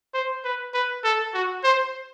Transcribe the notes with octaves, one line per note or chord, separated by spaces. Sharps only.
C5
B4
B4
A4
F#4
C5